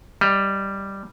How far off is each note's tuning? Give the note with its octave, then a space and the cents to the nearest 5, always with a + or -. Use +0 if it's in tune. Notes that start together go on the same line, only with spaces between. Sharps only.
G3 +0 D#5 +0